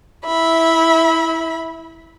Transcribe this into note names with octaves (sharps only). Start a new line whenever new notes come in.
E4 E5 B5